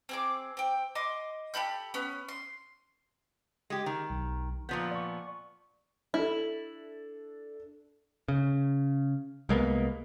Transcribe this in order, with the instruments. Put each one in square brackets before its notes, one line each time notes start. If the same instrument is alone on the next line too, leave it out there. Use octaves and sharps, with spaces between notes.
[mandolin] C4 G#4 D6
C4 G5
D#5 C6 D6
G4 A4 B5 G6
B3 C#4
C6
[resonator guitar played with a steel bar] G#3 G4
D#3
[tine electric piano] B1
[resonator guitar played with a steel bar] A#2 F3 B3 [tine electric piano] G6
[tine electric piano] D5 C#6
[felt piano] D4 A4 [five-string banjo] E4
[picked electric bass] C#3
C2 G#3 A#3 B3